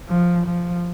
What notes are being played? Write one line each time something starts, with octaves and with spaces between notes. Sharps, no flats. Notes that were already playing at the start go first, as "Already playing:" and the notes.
F3
F3